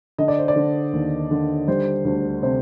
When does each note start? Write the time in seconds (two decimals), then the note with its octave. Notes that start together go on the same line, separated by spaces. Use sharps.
0.18 D3 D#5
0.28 D5
0.38 C5
0.48 D5
0.56 D3
0.93 D#2
1.31 D3
1.68 G3 C5
2.05 D2
2.43 C3 C5